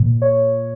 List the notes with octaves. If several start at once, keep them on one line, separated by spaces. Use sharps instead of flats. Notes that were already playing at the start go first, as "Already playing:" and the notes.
Already playing: A#2
C#5